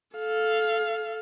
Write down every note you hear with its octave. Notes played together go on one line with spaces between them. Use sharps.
A4 F5